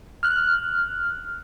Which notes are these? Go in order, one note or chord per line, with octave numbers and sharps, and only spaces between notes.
F6 F#6